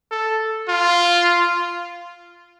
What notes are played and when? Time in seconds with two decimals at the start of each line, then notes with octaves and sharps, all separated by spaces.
0.11 A4
0.69 F4